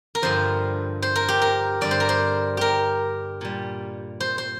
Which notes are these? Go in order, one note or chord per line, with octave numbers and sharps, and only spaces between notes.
A#4
G2 D3 F3 C5
C5
A#4
G4
A#4
G2 D3 G3 D5
C5
A#4
C5
G4 A#4
A#2 G3
C5
C5